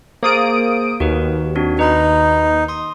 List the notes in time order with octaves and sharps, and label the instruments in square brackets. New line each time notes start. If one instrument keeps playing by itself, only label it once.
[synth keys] A#3 D#6 D7 [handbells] G#4 C5
[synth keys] D#2 [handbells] F#4 A#4 B4
[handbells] C4 D4 F#4
[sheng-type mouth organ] D#4 [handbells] B4 A#5 B5
[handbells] C6 D#6